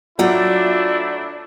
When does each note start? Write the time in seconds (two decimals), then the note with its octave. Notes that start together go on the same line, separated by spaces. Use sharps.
0.19 F#3 A3 D4 E4 F4 D5 F#5 G5